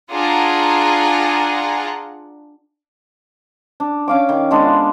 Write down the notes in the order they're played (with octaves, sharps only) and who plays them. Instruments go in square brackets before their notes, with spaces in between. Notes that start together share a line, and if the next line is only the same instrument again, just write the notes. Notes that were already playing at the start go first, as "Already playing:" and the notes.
[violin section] D4 F4 G#4 F#5 A#5
[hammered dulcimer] D4
C#4 F5 D6
D#3
G#3 B3 D4
F4